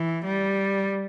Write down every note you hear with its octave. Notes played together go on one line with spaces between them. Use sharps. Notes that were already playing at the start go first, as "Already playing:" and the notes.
Already playing: E3
G3